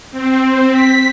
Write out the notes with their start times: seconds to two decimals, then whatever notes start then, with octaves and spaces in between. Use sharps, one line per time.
0.11 C4
0.70 B6